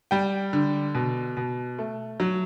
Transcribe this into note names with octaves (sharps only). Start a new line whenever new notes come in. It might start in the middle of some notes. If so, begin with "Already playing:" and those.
G3 G5
D3
B2
B2
A3
F#3